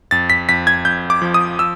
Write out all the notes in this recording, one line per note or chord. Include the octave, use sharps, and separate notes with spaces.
F2 A6
B6
F2 B6
G#6
F2 G6
D6
F3
D#6
F3 E6